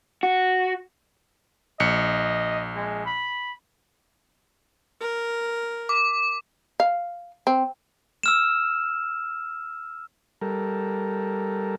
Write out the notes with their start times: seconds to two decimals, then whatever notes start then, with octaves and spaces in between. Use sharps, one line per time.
0.23 F#4
1.80 A#1 D#5 C#7
2.76 G#3
3.06 B5
5.01 A#4
5.89 D6
6.80 F5
7.47 C4
8.23 E6 F6 E7
10.41 G3 A4 A#4